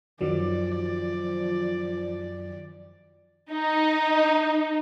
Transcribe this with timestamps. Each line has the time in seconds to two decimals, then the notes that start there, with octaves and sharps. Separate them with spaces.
0.21 F#2 D#3 F3 F#3 D5
3.52 D#4